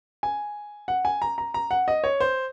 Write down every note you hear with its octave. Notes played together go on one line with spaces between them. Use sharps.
G#5
F#5
G#5
A#5
A#5
A#5
F#5
D#5
C#5
C5